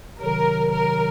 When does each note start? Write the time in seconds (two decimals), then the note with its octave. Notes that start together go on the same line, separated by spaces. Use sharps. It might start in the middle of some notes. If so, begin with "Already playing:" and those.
0.20 C3 D#3 F#3 A#4
0.72 A#4